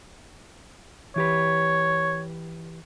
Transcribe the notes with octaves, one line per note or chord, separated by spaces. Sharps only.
E3 G4 B4 C#5